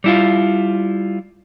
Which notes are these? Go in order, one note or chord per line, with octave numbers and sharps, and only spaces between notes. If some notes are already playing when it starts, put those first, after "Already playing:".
G3 E4 F4